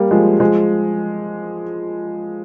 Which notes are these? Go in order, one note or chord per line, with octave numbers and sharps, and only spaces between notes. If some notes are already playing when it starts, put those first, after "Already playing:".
Already playing: G3 A#3
F3 G#3
F3 G#3